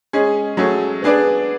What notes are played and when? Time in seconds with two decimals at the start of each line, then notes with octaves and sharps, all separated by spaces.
0.13 G#3 C#4 G#4
0.57 F#3 A3 C#4 G#4
1.02 B3 D4 G#4 B4 D5